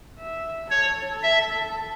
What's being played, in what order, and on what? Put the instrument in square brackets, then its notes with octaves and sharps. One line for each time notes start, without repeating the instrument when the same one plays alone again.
[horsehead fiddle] E5
[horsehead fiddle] A4 [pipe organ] C#5
[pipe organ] E5